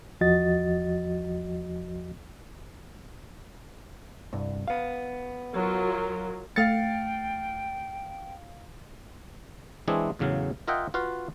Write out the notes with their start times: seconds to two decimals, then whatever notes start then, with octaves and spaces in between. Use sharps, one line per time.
0.21 E2 F3 F#4 D#5 A6
4.33 C2 G2
4.68 B3 F5
5.53 F#3 F4 A#4
6.56 A3 F5 G5 A6 C#7
9.88 E3 G#3 C4 D4 E4 G#4
10.19 E2 A2 C#3 F#3 F5
10.68 F4 A#4 D#5 E5 F#5 G5
10.94 F4 F#4 B4 F5